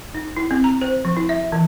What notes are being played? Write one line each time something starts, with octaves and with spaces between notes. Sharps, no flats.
D#4
E4
C4
A#5
C5
F3
E4
E5
E3